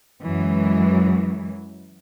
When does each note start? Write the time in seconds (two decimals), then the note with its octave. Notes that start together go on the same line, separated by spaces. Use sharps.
0.21 F#2 E3 F#3 G#3